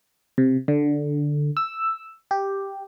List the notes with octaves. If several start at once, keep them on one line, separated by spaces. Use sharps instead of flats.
C3
D3
E6
G4